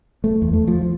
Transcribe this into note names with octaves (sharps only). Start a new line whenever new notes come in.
A3
E2
A3
F3
F3